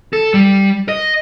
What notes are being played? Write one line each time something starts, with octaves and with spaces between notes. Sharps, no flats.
A4
G3
D#5